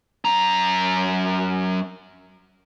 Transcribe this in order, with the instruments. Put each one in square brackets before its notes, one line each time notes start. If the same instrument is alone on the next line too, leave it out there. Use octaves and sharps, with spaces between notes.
[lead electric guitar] F#2 A#5